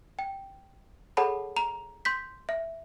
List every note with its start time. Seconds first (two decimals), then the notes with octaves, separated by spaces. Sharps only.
0.19 G5
1.17 G#4 A4 C#5 F#5 A5 B5
1.56 A#5 F7
2.05 C6 G6 B6
2.49 E5